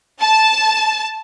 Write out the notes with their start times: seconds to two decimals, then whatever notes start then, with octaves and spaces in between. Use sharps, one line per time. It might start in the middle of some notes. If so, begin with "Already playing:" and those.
0.21 A5